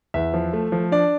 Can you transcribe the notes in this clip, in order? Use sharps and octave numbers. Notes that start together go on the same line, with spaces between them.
E2 E5
F3
A3
F3
D4 D5